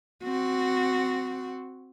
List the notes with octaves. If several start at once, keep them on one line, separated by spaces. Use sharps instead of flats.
C4 F#4